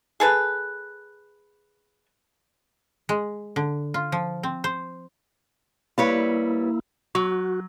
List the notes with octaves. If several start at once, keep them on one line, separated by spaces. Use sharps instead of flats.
G#4 A4 B4
G#3
D3
F4
F3
C4
C5
G3 A#3 E4 B4 C#5
F#3 F#4